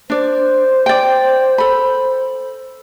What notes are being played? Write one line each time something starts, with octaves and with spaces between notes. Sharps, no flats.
D4 C5 D5
D5 G5
A4 B5